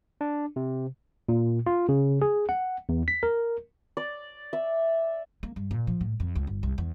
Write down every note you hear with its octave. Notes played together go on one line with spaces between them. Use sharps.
D4
C3
A#2
F4
C#3
G#4
F#5
E2
B6
A#4
D5
E5
A#3
G2
A#2
F3
A2
F2
C#2
G1
C2
E2